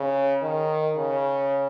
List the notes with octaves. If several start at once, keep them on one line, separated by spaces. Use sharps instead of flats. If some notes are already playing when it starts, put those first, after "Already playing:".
Already playing: C#3
D#3
C#3